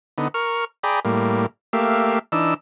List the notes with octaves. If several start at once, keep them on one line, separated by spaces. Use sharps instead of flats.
D3 B3 D#4
A#4 C#6 F6
G#4 D5 G5 A#5 B5
A2 G3 A#3
A3 A#3 G4 E5 F5
E3 D4 D#4 E6